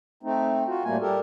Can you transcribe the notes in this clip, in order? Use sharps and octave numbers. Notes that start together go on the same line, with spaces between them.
A3 C4 D#4
F4 F#4
A2 G3 A3 A#3 G#5
G3 G4 A4 A#4